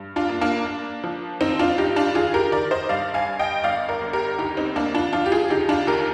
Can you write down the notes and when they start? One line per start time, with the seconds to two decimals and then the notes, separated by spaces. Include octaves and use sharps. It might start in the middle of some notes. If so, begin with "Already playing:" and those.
Already playing: G2
0.16 D4 F4
0.29 A#3
0.41 A#3 D4
0.66 A#3
1.04 F3
1.40 D#3 C4 D#4
1.59 D4 F4
1.78 G2 D#4 G4
1.96 D4 F4
2.15 D#3 F4 G#4
2.34 G4 A#4
2.52 D#3 A#4 D5
2.71 C5 D#5
2.89 G2 D5 F5
3.14 F5 G#5
3.27 G2
3.39 D#5 G5
3.64 G1 D5 F5
3.88 A#4 D5
4.01 G1
4.13 G4 A#4
4.38 D2 D#4 G4
4.57 C4 D#4
4.76 D2 A#3 D4
4.94 D4 F4
5.13 F3 D4 F4
5.26 G4
5.32 F4 G#4
5.50 D2 D#4 G4
5.69 D4 F4
5.87 D#2 G4 A#4